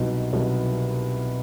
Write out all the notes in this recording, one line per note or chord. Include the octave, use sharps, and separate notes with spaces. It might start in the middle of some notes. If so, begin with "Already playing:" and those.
Already playing: C2 B2 F#3 B3 D#4
C2 B2 F#3 B3 D#4